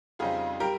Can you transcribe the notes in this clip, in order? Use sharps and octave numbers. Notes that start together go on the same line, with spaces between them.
F2 C#3 G3 C4 D#4 F4 G#4
G3 G4 A#4